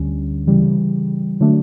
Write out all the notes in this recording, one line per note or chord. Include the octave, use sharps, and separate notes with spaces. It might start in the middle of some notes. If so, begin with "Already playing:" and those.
Already playing: D2 D3 G3 C#4
C#3 E3 G3
D3 F#3 A3 D4